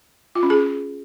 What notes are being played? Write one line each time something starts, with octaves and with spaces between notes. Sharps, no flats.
F4
C#4
G#4